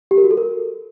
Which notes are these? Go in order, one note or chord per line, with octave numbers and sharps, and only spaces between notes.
G4
A#4
F#4
A4
A#4